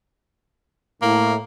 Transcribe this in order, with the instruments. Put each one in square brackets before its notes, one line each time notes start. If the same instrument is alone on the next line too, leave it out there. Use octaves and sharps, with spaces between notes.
[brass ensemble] A2 [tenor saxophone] A#3